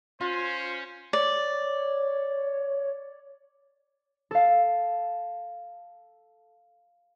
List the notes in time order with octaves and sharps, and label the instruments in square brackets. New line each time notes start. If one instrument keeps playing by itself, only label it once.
[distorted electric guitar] C#4 [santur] F4 [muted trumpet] C5
[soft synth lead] C#5 [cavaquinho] D5
[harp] A4 F5